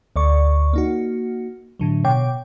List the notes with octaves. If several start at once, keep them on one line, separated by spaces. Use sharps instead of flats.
D2 D5 C#6
A#3 D#4 F#4
A2 D3 F#3
B2 C#5 G5 D6